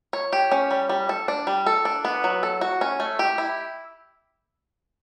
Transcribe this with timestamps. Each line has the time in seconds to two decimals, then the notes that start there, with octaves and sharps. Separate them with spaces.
0.13 C#5
0.33 G4
0.51 C#4
0.71 G3
0.89 G3
1.09 A4
1.28 D4
1.47 G3
1.66 A4
1.85 D4
2.05 B3
2.24 F#3
2.43 A4
2.61 F#4
2.81 C#4
3.00 A3
3.19 G4
3.38 E4